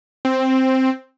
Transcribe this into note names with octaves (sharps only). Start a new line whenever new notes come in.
C4